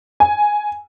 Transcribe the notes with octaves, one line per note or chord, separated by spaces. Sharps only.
G#5